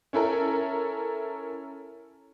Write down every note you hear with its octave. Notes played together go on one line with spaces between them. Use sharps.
C#4 E4 A4 A#4